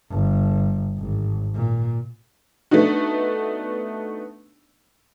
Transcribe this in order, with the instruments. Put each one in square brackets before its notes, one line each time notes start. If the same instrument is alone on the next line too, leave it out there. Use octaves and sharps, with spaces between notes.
[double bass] G1
G#1
A#2
[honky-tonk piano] A3 B3 D4 D#4 F#4